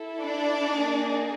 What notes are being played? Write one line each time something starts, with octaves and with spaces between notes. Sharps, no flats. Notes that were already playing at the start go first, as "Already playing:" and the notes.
Already playing: E4 A4
D4 D5
A#3 D#4 G#4